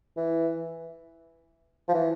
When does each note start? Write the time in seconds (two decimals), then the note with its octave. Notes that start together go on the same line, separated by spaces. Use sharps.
0.17 E3
1.89 F3
1.94 E3